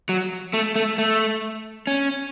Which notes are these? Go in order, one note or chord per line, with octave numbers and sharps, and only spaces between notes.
F#3
A3
A3
A3
C#4